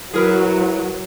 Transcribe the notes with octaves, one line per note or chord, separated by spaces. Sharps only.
F#3 E4 G#4 A#4 B4